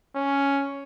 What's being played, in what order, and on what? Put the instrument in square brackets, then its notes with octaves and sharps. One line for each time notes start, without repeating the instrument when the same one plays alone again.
[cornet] C#4